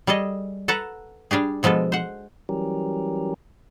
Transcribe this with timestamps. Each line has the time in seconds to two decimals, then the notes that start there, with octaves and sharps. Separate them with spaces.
0.07 G3 G#4 A4 D#5
0.68 A4 B4 F#5 A5 A#5
1.31 G3 D4 G4 G#4
1.63 B2 F3 G#3 B3 A4
1.92 C5 F#5
2.49 E3 F#3 G3 C#4 G4 A#4